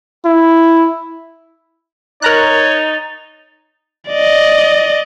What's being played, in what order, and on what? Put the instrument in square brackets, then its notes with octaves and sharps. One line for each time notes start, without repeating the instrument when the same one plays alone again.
[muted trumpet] E4
[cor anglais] D#4 [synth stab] A#4 A#5 F#6 [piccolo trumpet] C#5 [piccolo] A6
[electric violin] D5 D#5